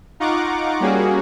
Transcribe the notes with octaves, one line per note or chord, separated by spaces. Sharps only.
D#4 F4 F#5 A#5 C#6 D6
G3 A#3 C#4 F#4 G#4